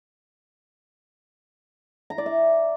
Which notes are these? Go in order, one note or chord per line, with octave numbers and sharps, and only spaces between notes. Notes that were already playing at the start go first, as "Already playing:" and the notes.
A#5
D5
E5